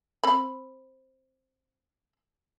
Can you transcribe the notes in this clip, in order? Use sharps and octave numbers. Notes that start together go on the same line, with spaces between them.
C4 B5